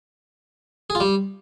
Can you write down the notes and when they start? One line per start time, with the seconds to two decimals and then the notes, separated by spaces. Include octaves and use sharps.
0.90 G#4
0.95 F4
1.00 G3